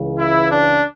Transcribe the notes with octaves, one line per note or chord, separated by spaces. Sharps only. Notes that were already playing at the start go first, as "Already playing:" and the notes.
Already playing: C#2 C#3 E3
E4
D4